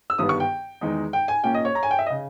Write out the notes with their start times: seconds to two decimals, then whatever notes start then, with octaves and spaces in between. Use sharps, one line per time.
0.10 E6
0.18 G1 G2 D#3 G3 B3 D#6
0.29 C#6
0.40 G5
0.81 E2 D#3 G#3 D#4
1.13 G5
1.28 G#5
1.44 A#2 A#3 C#4 G5
1.54 D#5
1.65 C#5
1.75 A#5
1.83 G#5
1.91 G5
1.99 E5
2.06 D#5
2.10 C#3